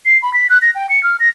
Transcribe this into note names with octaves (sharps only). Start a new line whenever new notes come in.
C7
B5
B6
F#6
A#6
G5
C#7
F6
A#6